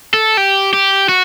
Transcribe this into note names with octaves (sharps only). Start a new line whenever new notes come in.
A4
G4
G4
F#4